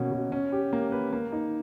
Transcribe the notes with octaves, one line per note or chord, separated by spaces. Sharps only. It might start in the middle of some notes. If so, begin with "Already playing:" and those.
Already playing: B2 A#3 C#4
B2
C#4
G4
A#3
B4
A#3
D#4